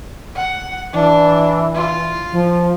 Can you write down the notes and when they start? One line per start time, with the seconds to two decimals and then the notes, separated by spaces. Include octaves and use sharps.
0.35 F#5
0.93 E3 D4
1.74 F4
2.32 F3